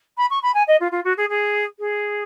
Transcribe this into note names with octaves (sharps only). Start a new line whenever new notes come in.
B5
C#6
B5
G#5
D#5
F4
F4
F#4
G#4
G#4
G#4